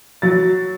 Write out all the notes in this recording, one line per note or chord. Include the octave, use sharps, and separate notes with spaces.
F#3 A6